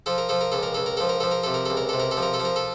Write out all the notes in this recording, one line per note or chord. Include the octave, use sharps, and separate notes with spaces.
F3 A4
A#4
F3 A4
A#4
C#2 A4
A#4
C#2 A4
A#4
F3 A4
A#4
F3 A4
A#4
C3 A4
A#4
C#2 A4
A#4
C3 A4
A#4
A4
F3
A#4
A4
F3
A#4
A4